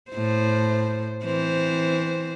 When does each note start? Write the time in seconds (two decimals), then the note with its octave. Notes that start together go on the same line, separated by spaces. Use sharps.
0.11 A2 C5
1.24 E3 C4 C5